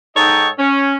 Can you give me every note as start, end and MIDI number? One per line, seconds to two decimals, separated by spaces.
0.16 0.48 44
0.16 0.48 63
0.16 0.48 69
0.16 0.48 73
0.16 0.48 75
0.16 0.48 79
0.59 0.96 61